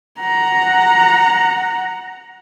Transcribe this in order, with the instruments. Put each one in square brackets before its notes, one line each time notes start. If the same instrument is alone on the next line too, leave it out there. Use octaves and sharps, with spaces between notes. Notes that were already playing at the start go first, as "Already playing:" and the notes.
[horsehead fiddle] F#5 A#5